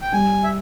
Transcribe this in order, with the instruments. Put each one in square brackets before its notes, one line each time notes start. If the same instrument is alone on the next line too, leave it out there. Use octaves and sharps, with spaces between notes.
[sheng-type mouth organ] G5
[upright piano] G3 [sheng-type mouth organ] G#5
[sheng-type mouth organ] E5